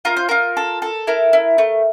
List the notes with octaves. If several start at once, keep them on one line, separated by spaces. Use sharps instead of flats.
F4 A#4
C5
F4 A#4
A4
A4
E4 A#4
E4
A3